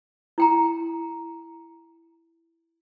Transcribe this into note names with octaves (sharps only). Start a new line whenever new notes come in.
E4 G5 A#5